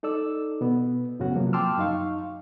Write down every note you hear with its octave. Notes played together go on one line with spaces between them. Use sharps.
D#4 A4 D5 E6
B2 B3
F#2 A2 C#3 B3 C#4 F#4
C3 F3 F#3 A#3
G5 A5 C6 D6 E6 F6
F#2 D#4 F5 C#6